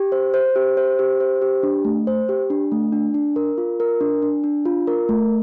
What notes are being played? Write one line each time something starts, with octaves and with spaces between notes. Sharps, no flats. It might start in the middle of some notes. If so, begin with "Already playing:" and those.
Already playing: G4
C5
C5
G4
C5
G4
C5
G4
D4
A3
C5
G4
D4
A3
D4
D4
A#4
F4
A#4
D4
D4
D4
F4
A#4
A3